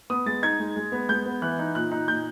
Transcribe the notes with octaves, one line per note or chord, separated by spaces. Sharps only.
B3 D#6
G#3 A6
D#4 G#6
G#3
G#3
B3
G#3 G6
B3
E3 F#6
D#4
A#2 F#6
D#4
A#2 G6